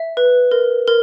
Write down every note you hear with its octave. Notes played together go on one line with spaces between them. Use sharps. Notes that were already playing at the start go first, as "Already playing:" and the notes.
Already playing: E5
B4
A#4
A#4